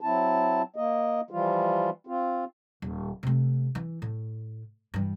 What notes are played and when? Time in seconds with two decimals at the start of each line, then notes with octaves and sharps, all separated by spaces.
0.01 F#3 C4 E4 A5
0.76 A#3 D#5
1.31 E3 F3 G3 F4
2.07 C4 F4
2.82 D#1
3.23 C3 A3
3.75 E3
4.02 A2
4.94 G2 E3